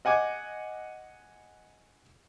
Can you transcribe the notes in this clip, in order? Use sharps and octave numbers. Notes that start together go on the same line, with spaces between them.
D#5 F#5 G#5 D6